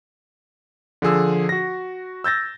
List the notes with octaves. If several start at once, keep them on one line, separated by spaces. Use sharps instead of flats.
D3 F3 G#4 E6
F#4 A#6
E6 G6 A6 A#6